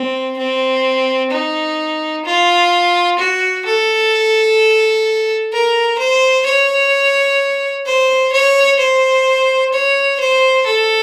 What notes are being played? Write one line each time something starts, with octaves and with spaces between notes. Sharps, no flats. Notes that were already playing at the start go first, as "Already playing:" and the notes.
Already playing: C4
C4
D#4
F4
F#4
A4
A#4
C5
C#5
C5
C#5
C5
C#5
C5
A4